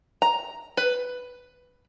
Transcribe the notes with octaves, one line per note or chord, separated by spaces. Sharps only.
A#5
B4